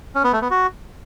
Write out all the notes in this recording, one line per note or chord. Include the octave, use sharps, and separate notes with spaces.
C#4
B3
A3
B3
F#4